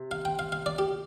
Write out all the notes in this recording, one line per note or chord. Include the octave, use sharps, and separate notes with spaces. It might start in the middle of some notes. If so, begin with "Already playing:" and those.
Already playing: C3
F5
G5
F5
F5
D5
G4